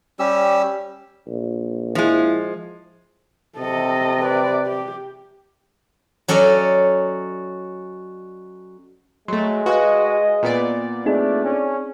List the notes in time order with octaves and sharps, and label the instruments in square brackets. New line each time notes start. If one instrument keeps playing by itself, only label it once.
[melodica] G3 C#4 G4 E6
[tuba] A#1
[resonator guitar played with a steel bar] F3 G#3 [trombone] E4
[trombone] C3 [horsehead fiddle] A4 D#5
[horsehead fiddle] B4 D5
G4
[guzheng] F#3 C#4 A4 D5 D#5
[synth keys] F#3 A3 [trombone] G#3 [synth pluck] C6
[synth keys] F#4 [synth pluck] B4 F5 G#5 [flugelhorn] D#5
[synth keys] A#2 B3 D5
[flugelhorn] A3 [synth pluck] C4 D#4 G#4 [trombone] D4
[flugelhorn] C#4